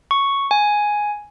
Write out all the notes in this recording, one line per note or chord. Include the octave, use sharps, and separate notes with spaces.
C#6
G#5